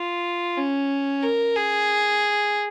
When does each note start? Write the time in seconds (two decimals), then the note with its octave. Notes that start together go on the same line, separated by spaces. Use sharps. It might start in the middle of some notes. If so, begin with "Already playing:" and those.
Already playing: F4
0.57 C#4
1.23 A#4
1.56 G#4